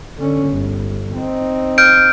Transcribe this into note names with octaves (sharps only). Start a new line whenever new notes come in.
D3 C#4
G1
C4 D#4
F6 G6 D7